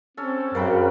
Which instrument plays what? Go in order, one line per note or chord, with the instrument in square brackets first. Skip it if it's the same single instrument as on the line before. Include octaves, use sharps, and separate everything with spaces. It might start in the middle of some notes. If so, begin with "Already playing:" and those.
[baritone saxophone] C4 [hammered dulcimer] C#4 A4
[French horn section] F#2 [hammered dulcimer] C#3 A#3 B4 [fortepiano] A#4 G5